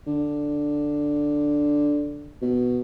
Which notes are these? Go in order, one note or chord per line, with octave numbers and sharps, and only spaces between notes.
D3
B2